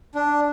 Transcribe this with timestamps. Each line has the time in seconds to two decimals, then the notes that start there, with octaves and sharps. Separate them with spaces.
0.15 D4